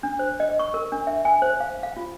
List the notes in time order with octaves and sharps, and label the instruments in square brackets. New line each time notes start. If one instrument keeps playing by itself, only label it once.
[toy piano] D4
C5
D#5
C#6
A#4
D4
E5
G#5
C5
F5
F5
F4